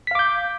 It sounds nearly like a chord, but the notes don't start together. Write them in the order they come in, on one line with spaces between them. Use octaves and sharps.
B6 F5 D6 G6